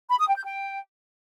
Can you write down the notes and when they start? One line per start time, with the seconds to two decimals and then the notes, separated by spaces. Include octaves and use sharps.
0.11 B5
0.19 D#6
0.27 G5
0.36 G6
0.44 G5